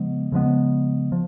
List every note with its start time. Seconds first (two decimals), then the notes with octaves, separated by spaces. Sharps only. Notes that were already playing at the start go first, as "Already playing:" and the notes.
Already playing: C#3 F3 G#3 B3
0.32 C#3 F3 G#3 B3
1.12 F3